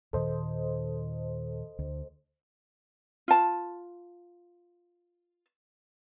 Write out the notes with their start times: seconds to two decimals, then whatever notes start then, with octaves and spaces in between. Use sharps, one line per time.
0.13 D#2 A#2 D#3 A4 C5 D#5
1.79 D2
3.28 F4 A5